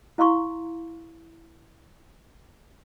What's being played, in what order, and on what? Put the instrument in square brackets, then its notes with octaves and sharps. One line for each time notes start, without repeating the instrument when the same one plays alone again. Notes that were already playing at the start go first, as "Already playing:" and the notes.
[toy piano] E4 F5 A#5 C6 C#6